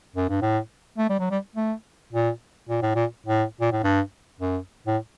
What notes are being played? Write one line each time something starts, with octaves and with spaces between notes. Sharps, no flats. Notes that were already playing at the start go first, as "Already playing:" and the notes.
F#2
G2
A2
A3
G3
F#3
G3
A3
A#2
A#2
A2
A#2
A2
A#2
A2
G2
F#2
A2